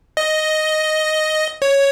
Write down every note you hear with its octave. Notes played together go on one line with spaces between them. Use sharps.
D#5
C#5